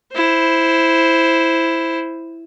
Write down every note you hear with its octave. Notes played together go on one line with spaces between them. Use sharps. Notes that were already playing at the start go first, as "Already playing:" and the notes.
E4 C5